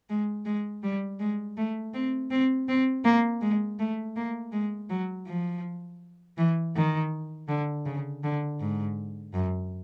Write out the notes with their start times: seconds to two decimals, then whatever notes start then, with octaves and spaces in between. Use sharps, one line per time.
0.09 G#3
0.45 G#3
0.83 G3
1.20 G#3
1.57 A3
1.94 C4
2.31 C4
2.68 C4
3.04 A#3
3.41 G#3
3.79 A3
4.16 A#3
4.52 G#3
4.90 F#3
5.27 F3
6.37 E3
6.75 D#3
7.48 D3
7.85 C#3
8.23 D3
8.60 G#2
9.34 F#2